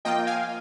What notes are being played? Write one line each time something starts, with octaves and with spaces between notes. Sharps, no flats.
F3 A#3 F4 D#5 G5
F5 G#5